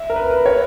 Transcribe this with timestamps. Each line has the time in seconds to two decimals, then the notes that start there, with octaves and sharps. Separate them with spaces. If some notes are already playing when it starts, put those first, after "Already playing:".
Already playing: E5
0.10 A#4
0.16 B4
0.30 B4
0.46 C#5